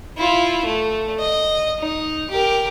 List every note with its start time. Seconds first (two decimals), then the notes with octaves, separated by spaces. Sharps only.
0.18 E4 F4
0.65 A3
1.19 D#5
1.80 D#4
2.30 G4 A#4